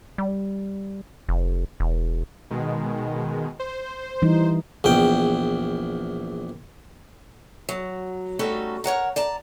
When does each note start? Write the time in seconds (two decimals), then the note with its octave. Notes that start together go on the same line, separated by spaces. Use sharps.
0.18 G3
1.29 F1
1.80 E1
2.51 B2 D#3 G#3
3.59 C5
4.22 E3 G3 D#4
4.84 A#1 E2 G5
7.69 F#3
8.39 G3 A3 C#4 D#4 F#4 A4
8.84 A#4 C#5 F#5 A#5
9.16 D5 A5 A#5